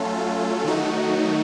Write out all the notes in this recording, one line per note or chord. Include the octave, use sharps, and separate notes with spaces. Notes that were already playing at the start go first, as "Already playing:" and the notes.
Already playing: F#3 A3 C#4 F4 A4
D#3 F#3 A3 D#4 F#4